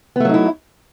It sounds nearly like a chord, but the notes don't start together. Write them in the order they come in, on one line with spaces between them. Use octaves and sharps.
B3 A3 F#3 D#4 E4